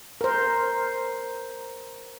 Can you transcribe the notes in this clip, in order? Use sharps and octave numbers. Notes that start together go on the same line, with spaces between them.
A#4 C5